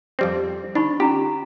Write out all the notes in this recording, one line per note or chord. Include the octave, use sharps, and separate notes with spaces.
F2 G3 C4
D4 D#4 B5 C#6
C#4 F4 G4 A#5